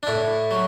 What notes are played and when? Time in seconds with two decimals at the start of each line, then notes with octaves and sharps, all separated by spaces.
0.03 D4
0.07 A2 E4
0.51 F#3